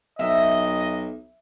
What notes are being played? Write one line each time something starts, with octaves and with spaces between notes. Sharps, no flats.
B1 D#5 E5